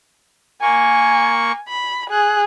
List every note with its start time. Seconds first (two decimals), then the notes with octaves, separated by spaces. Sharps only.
0.62 A#3 G#5 C#6
1.68 B5
2.10 G#4 F#6